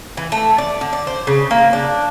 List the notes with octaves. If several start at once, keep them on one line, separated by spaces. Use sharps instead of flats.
E3
A3
D5
D3
D5
C5
C#3
A#3
D4